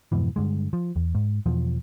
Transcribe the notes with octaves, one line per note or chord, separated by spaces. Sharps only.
F2 G#2 B2 E3
G2 D3 G#3
F3
E2
G#2
E2 B2 F3